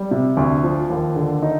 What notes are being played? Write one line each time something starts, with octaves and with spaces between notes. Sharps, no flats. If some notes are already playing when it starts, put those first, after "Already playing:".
Already playing: G3
C3
D2
F3
D#2
D3
D#4